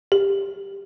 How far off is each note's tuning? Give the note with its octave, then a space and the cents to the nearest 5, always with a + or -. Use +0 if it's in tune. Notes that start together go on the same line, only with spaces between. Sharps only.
G4 +15